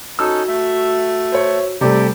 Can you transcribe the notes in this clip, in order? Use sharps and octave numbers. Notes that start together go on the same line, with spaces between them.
C#4 D#4 F#4 A4 E6
A3 E5
C5 C#5
C3 G3 A3 G4 D5